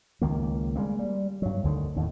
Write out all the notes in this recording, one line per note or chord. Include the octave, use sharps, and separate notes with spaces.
C#2 D#3 A#3
G3 G#3 A#3 C4
G3
G2 F#3
D2 D3 D#3
D#2 A2